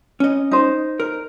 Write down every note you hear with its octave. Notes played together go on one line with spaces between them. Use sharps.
C#4 D#5
D#4 C5
A#4